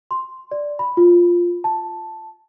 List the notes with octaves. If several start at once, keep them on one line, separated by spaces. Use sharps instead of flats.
C6
D5
B5
F4
A5